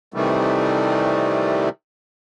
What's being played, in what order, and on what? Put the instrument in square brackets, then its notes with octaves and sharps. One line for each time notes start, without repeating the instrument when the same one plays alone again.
[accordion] C3 D#3 E3 G3 A3